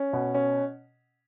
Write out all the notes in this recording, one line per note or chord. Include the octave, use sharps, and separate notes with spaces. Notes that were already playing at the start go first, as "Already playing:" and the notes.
Already playing: C#4
B2
C#4